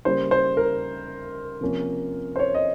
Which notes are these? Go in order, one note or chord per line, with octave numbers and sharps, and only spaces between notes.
C#3 G3 A#3 C5
C5
A#4
C3 F3 A#3 C#4
C5
C#5
D#5